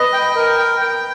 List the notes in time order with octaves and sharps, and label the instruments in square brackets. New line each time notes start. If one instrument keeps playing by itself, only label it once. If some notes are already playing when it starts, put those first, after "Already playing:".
Already playing: [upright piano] B4 [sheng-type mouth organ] D#5
[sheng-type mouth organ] G5
A#4
G5
G5